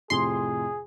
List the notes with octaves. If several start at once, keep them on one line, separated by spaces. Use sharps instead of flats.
F2 A2 C3 G#4 C6